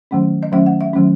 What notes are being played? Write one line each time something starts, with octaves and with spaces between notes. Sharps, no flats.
D#3 F#3 A3 C#4
D#5
D#3 F#3 A3 C#4 E5
F#5
E5
D#3 F#3 A3 C#4